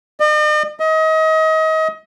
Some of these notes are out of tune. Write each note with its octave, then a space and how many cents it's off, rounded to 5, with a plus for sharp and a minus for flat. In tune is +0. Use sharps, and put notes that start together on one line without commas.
D#5 -45
D#5 +30